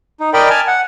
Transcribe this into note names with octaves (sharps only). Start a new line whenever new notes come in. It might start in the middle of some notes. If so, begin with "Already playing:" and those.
D#4
A#4 D5 D#5 G5 B5
G#5 A5 F6
F#5